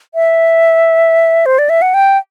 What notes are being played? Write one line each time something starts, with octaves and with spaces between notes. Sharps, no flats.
E5
C5
D5
E5
F#5
G5